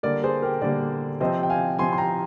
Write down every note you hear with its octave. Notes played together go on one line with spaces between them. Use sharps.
D3 G3 A#3 A#4 D5
G#4 C5
G4 A#4
D3 G3 A#3 A#4 D5
C3 F3 C4 C5 D#5
G5
F5 G#5
C3 F3 C4 G#5 C6
C6
G5 A#5